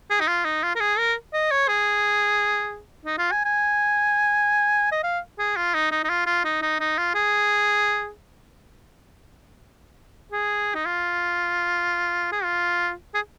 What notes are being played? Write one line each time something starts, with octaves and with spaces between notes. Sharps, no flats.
G#4
D#4
F4
D#4
F4
A#4
G#4
A#4
D#5
C#5
G#4
D#4
F4
G#5
G#5
D#5
F5
G#4
F4
D#4
D#4
D#4
F4
F4
D#4
D#4
D#4
F4
G#4
G#4
D#4
F4
G#4
F4
G#4